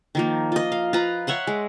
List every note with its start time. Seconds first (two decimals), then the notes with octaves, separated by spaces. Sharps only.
0.15 D#3 F3 A#3
0.52 F4 D#5
0.72 F5
0.93 F4 B4 A#5
1.27 C#5 E5 F#5 C6
1.47 G#3